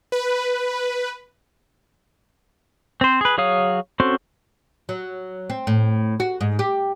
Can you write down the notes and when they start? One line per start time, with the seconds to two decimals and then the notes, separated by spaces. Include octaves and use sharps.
0.12 B4
3.01 C4 C5
3.21 G#4 B4
3.38 F#3 G#4 C#5 F5 D#6
4.00 C4 C#4 F#4 A4 C5
4.89 F#3
5.50 C4
5.67 A2
6.20 F#4
6.41 G#2
6.59 G4